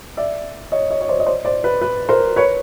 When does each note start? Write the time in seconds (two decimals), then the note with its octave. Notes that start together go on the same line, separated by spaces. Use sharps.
0.17 D5 E5
0.72 C#5 D#5
0.90 C#5 D#5
1.01 C#5
1.08 C5 D5
1.20 D#5
1.27 C5 D5
1.45 C5 D5
1.64 B4
1.82 B4
2.09 A#4 C5
2.36 B4 C#5